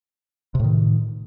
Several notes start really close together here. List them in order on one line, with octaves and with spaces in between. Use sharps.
C3 A2 D#3